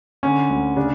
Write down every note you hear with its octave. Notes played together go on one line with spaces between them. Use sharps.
D3 C#4
D2
C#3 D4